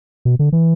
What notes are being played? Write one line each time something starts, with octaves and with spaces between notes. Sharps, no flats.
B2
D3
E3